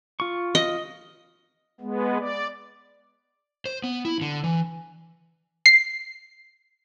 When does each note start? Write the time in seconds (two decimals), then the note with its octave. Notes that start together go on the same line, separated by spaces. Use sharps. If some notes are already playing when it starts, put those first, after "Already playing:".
0.20 F4 C#6
0.55 D#5
1.81 G#3 B3
2.20 D5
3.65 C5
3.84 B3
4.05 E4
4.21 D3
4.44 E3
5.66 C7